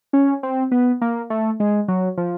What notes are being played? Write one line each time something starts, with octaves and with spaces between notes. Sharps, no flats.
C#4
C4
B3
A#3
A3
G#3
F#3
F3